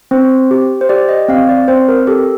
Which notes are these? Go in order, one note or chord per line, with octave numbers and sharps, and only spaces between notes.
C4 C5
G4
C5
G4 D5
D#5
C4 F5
D5
C4 C5
A#4
G4 A4